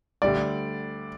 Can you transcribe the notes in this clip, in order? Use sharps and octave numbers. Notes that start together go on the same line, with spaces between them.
D2 D3 G3 D5